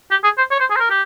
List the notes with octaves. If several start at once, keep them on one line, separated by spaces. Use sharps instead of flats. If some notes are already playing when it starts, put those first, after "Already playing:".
G4
G#4
C5
C#5
C5
G#4
C5
A#4
G4